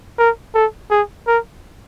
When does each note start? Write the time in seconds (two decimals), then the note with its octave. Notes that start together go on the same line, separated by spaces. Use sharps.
0.18 A#4
0.55 A4
0.91 G#4
1.27 A#4